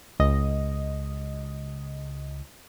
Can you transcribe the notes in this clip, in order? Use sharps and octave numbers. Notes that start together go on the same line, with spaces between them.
C#2 D#5